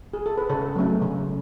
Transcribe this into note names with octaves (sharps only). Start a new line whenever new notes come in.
G#4
A4
B4
C#3 A4 C#5
F#3 A3 C#4
C#3